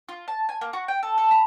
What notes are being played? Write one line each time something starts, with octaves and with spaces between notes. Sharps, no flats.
F4
A5
G#5
A#3
F#4
G5
A4
A4
B5